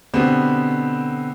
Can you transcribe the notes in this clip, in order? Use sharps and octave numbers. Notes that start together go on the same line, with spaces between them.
B2 D3 B3 C4 G4